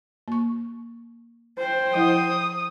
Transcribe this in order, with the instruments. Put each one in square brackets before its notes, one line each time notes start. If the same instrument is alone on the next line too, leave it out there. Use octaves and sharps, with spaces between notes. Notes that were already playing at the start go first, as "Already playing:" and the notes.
[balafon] A#3 C#6
[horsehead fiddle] C5 G5
[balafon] F3 E4 F#5 [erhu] D#6